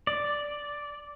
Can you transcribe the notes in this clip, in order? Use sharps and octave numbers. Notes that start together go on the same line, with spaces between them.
D5